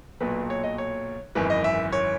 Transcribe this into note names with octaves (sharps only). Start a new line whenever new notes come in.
B1 A#2 F#3 B4
C#5
D#5
C#5
G#1 F#2 E3 B4
D#5
E5
C#5